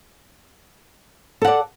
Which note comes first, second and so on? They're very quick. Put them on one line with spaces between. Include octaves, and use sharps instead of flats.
A4 F#5 D5